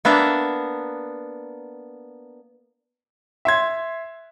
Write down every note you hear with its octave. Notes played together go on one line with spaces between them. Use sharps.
A#3 B3 D4 E5
E5 C6 G#6